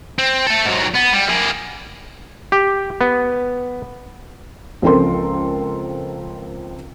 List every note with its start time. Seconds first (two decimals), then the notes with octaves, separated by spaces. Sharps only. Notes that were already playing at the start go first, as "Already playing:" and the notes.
0.18 C4
0.47 A3 A4
0.65 G#2 F#3
0.94 B3
1.13 G3
1.29 A#3 G#4
2.52 G4
3.01 B3
4.82 C#2 F3 C4 A4 A#4 C6